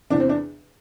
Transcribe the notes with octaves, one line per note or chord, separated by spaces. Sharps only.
E2 C3 E3 D4
C4
D4